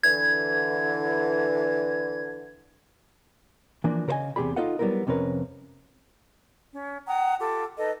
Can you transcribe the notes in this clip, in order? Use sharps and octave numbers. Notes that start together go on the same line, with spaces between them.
D3 E3 G#6
E3 F3 A#3 D4
C#3 A#4 C5 D#5 G#5
E2 C3 F#3 G4 G#4 B5
D#4 F4 A4 D#5 F5 F#5
F#3 G3 B3 D#4 E4 A#4
F2 C3 C#4 A#4 B4
C#4
F#5 G5 A#5 D#6
F4 G4 A4 D6
D#4 A4 B4 D#5